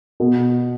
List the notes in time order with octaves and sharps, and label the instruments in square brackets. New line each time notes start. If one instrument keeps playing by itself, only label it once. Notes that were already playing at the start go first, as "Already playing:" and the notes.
[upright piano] B2